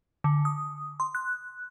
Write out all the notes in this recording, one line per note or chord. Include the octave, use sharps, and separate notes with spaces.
D3
D#6
C6
F#6